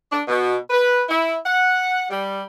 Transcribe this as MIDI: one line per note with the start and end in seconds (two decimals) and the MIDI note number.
0.12 0.22 62
0.28 0.56 47
0.70 1.02 71
1.09 1.35 64
1.45 2.04 78
2.10 2.40 55